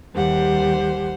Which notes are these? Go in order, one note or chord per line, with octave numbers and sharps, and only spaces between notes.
D#2 G3 G4 C5 F#5